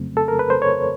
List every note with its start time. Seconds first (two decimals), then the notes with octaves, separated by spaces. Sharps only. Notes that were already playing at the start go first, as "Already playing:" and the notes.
Already playing: F2 C#3 F#3 A3 C4
0.17 A4
0.28 A#4
0.39 B4
0.50 C5
0.62 C#5